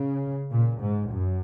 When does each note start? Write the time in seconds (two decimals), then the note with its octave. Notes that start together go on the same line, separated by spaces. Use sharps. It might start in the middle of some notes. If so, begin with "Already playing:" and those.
Already playing: C#3
0.50 A#2
0.81 G#2
1.11 F#2